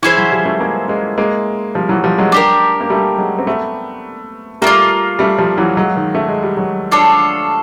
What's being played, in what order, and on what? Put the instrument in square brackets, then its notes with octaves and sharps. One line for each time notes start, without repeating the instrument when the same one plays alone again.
[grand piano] E3 [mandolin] C#4 E4 G#4 C5
[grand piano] E3 F#3
F3 G3
G3 A3
G#3 A#3
G#3 A#3
G#3 A#3
F3 G3
E3 F#3
F3 G3
F#3 G#3
[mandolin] D4 G4 A#4
[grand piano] A#3
G3 A3
F#3 G#3
C4
A3 B3
[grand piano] G3 A3 [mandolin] A#3 D4
[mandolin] F4
[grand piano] G3 A3
F3 G3
E3 F#3
F#3 G#3
D#3
A3
G#3
G3
F#3 G#3
[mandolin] D4 F4 A4 C#5